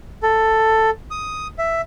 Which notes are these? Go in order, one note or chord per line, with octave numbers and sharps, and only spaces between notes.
A4
D#6
E5